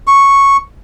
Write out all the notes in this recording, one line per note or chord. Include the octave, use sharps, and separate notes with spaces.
C#6